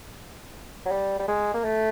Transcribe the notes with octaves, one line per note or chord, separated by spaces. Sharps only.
F#3
G3
G3
G#3
A#3
A3